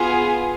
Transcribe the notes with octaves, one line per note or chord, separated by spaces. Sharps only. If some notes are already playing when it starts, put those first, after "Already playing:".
Already playing: B3 F4 G#4